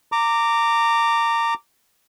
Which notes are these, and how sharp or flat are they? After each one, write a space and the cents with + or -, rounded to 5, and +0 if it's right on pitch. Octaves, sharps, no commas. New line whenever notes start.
A#5 -20 D6 +0